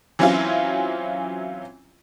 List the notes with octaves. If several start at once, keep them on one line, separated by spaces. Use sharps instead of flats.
E3 F#3 C4 C#4 E4 F4